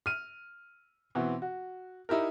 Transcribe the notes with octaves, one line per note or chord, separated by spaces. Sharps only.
F6 D#7
B2 E3 B3 C4
F#4
D#4 E4 G4 A#4